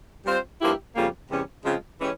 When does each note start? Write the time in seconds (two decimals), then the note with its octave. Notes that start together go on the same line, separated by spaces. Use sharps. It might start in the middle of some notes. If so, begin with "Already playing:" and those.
0.26 G3 C4 F4 C5
0.61 G2 F3 A#3 E4 G4
0.95 F2 C#3 G3 A#3 F4
1.30 E2 C3 G3 C#4
1.64 C#3 F3 G#3 C4 F4
2.00 E3 G#3 C#4 G4